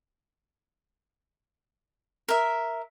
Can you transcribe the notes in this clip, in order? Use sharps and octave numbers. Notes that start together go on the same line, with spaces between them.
A#4 E5